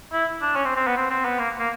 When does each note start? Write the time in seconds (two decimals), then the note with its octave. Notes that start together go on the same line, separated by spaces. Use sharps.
0.13 E4
0.42 D4
0.56 C#4
0.65 C4
0.76 C4
0.87 B3
0.97 C4
1.11 C4
1.25 B3
1.39 A#3
1.59 A#3